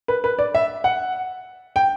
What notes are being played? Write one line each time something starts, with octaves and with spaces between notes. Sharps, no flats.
B4
B4
D5
E5
F#5
G5